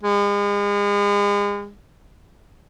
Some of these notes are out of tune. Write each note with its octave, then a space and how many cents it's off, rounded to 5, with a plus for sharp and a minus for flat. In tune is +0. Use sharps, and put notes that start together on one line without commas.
G#3 -40